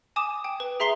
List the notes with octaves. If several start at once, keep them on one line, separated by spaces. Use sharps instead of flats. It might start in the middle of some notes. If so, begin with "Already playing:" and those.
G#5 D6 D#6 E7
G5
B4
G#4 E5 A#5 C6 C7 G7